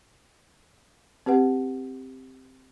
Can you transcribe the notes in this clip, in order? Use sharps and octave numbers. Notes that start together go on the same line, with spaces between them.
C4 G4 B4 F#5